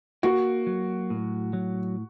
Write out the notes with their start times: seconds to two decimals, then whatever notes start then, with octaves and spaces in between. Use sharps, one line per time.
0.23 A#3 F#4
0.67 F#3
1.10 A2
1.53 F#3